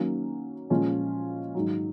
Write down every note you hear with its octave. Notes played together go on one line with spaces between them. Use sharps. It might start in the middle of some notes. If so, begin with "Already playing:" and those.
Already playing: D#3 F#3 A#3 C#4 F#4
A#2 F3 G#3 C#4 F4
G#2 D#3 F#3